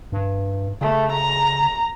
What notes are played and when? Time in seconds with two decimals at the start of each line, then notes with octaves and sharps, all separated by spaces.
0.12 G2
0.81 C#3 A3
1.13 A#5